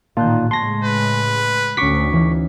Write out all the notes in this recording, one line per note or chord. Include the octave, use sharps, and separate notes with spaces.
A1 A#2 D#3 F4 A5 F#6 G6
A2 C#3 G#3 A5 C6 C#6 G#6 A#6
B4
D2 C#4 F#4 C#6 D6 B6
E3 C#4 D#4